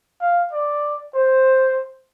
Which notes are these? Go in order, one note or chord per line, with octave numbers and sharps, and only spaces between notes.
F5
D5
C5